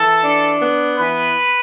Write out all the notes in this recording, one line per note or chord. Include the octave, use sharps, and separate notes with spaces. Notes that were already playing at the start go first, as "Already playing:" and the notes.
Already playing: E3 A4
D4
B3
E3 B4